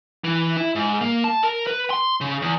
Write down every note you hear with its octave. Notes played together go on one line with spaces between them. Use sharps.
E3
E4
G#2
A#3
A5
A#4
B4
C6
C#3
E2